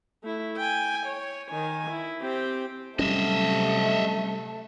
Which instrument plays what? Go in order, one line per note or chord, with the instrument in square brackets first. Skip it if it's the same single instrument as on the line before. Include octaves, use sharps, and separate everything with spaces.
[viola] A3 E4
G5 G#5
C#5
D#3 G#5
E4
C4 G4
[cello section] C3 F#3 [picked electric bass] G3 C#4 [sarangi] A3 [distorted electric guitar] D#5 E5